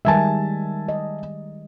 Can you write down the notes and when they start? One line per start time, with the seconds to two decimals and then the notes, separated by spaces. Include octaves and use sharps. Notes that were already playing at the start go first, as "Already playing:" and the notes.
0.05 D#3 G3 G#3 E5 G#5 A5
0.89 D#5